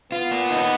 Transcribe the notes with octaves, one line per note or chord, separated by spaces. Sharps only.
B3 F4
A#3
D#4